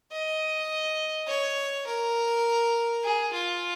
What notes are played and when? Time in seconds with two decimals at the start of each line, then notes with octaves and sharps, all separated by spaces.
0.12 D#5
1.28 C#5
1.86 A#4
3.04 G#4
3.33 F4